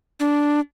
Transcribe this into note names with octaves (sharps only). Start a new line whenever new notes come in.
D4